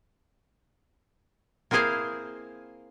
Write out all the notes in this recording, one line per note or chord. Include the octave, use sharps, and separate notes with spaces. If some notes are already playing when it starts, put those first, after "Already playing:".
A#3 C4 E4 G#4 C5 F5